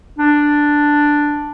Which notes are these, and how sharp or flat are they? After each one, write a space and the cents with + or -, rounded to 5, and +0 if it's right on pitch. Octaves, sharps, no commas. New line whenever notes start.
D4 +5